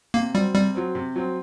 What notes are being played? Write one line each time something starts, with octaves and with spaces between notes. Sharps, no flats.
C3 A#3
F#3 G3 C4
C3 G3
F#3 C4
C3
F#3 C4